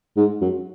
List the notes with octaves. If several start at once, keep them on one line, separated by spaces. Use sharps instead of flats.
G#2
F#2